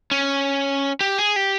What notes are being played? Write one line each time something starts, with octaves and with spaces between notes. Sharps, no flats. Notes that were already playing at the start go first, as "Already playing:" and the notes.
C#4
G4
G#4
G4